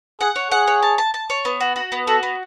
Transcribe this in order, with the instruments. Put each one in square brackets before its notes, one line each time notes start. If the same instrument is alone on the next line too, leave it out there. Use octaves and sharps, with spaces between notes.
[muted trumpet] G#4 [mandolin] F#5
[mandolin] C#5
[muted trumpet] G#4 [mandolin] F#5
[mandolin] C#5
A5
A5
A5
C#5
B3
F#4
F#4
B3
[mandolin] F#4 [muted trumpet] A4
[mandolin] B3